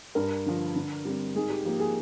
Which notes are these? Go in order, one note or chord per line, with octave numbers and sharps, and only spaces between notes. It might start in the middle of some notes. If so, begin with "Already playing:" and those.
G2 A#4
D3 F3
D3
G3 C4
G#2 G#4
G4
F3 A#3 G4
G#4